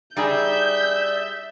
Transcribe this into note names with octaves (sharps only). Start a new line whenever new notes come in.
G3 D#4 G#4 D5 E5 G6